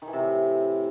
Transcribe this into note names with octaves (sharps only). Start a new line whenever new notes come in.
D#3
E3
C3
A2